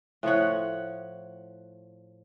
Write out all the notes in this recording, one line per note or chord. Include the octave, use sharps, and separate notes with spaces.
A2 F3 C#5 F#5